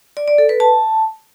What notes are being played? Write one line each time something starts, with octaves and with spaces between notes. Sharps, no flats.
D5
D5
A4
B4
A5